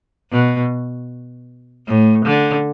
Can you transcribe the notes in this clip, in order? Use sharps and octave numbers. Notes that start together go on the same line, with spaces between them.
B2
A2
D3